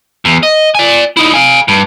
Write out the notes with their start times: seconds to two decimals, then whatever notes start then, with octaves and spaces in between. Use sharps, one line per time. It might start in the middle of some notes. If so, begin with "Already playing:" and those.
0.25 E2
0.43 D#5
0.75 D5 G#5
1.17 D#4 E4
1.34 F5 G#5
1.68 G2